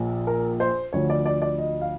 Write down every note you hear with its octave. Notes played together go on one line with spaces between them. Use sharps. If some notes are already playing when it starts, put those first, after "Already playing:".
Already playing: A#1 A#2 F3
A#4
C5
D2 D3 F3 C#5
D5
D5
D5
D#5
F5